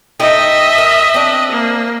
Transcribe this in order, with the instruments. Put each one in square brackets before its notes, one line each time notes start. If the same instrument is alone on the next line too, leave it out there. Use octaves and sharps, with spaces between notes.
[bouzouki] A3 D#4 G5 [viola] D#5 E5
[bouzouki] A#4
C4 D4
[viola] A#3